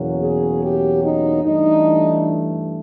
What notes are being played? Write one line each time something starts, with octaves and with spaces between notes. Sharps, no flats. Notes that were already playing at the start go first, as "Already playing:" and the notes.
Already playing: E2 B2 F#3 A#3 C#4
G#4
G4
D#4
G2 E3 A3 D4 D#4